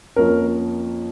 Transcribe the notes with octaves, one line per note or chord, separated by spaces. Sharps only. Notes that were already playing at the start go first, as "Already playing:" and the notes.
F2 F3 A#3 C#4 A#4